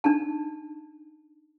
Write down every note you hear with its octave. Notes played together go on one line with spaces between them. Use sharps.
D4 D#4 A5